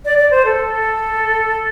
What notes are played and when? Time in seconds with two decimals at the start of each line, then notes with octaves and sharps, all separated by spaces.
0.05 D5
0.18 D5
0.31 C5
0.45 A4